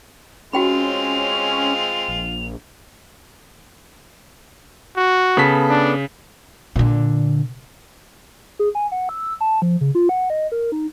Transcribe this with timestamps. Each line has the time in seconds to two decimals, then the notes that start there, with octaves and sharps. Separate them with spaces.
0.53 G#3 C4 C#4 F4 F#4 G5 B5 F7
2.08 A#1
4.97 F#4
5.37 C#3 B3 A4 B6
5.69 D4
6.76 A#2 D3
8.59 G#4
8.75 G#5
8.92 F#5
9.09 E6
9.41 A5
9.62 F3
9.81 C#3
9.95 F4
10.09 F#5
10.30 D#5
10.52 A#4
10.72 D#4